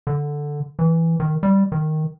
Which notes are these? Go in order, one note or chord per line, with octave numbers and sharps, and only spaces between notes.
D3
E3
D#3
G3
D#3